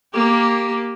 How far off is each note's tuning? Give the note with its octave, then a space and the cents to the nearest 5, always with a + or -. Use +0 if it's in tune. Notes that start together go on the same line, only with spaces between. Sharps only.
A#3 +0 G4 +0